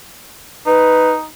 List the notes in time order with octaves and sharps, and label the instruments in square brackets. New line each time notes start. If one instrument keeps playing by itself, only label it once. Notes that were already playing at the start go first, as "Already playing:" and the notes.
[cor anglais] D#4 [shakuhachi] B4